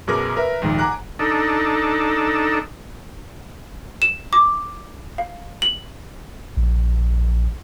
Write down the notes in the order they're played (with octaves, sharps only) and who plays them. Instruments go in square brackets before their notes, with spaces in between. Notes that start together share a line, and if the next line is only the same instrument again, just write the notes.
[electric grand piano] F#2 B2 G#4 A#4 D6 A#6
A#4 B4 E5
A#1 D#2 G#2 D#3
F#5 G#5 A#5 D6 F#6
[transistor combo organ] D4 D#4 A4
[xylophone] E7
D6
F5
F#7
[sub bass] A#1